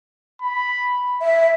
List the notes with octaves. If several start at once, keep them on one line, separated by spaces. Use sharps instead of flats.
B5
E5